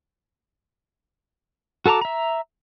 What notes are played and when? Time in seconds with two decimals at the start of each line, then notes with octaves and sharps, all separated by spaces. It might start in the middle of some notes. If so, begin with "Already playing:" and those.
1.86 F#4 A4 A5 A#5 D6
2.01 E5 A#5